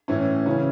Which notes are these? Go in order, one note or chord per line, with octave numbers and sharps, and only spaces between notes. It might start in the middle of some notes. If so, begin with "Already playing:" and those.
A2 E3 C#4 E4
C#3 E3 C#4 E4